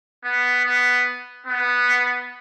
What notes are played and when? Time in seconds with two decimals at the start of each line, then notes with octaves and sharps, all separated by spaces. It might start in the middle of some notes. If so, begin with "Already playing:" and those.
0.24 B3
0.65 B3
1.46 B3